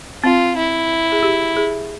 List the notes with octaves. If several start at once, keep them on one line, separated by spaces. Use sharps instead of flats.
C4 F4
E4
G#4
G4
G#4